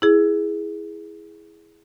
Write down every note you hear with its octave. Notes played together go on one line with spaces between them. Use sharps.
E4 G#4